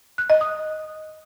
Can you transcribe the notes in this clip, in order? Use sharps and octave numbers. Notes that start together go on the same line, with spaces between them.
F#6
D#5
D#6